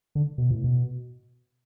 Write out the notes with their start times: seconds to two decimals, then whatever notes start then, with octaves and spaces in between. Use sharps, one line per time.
0.15 D3
0.38 B2
0.51 A2
0.64 B2